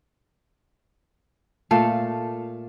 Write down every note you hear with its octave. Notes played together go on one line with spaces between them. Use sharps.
A#2 A3 A4 F5